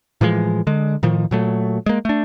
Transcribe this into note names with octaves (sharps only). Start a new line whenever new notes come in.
A2 E3 F3 G#3
D3 G#3
A2 D#3 F3
A#2 F#3 A3
G#3 A#3
A3 D4